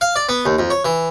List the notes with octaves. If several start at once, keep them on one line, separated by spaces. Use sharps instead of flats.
F5
D5
B3
D#2
F2
C#5
E3